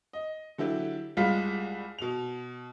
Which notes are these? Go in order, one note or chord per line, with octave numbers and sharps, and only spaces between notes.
D#5
D3 F#3 E4 G4
C2 G3 G#3 F4 F5 B6
B2 F7